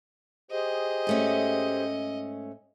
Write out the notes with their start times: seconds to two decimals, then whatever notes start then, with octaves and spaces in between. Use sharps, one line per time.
0.51 G4 G#4 C5 D#5
1.07 G#2 A3 C#4